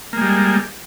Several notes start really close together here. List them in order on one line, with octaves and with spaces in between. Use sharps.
A#3 G#3 G3